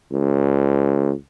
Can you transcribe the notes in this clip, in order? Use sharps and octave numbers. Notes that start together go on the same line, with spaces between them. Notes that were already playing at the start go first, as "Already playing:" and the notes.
C#2